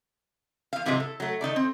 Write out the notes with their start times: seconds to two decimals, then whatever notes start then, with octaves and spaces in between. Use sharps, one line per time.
0.73 E2 F5
0.85 G#2 C3 E3 F#3 G#3
1.00 A4
1.20 F#3 A3
1.41 D#3 D#4 A4 D5
1.56 C4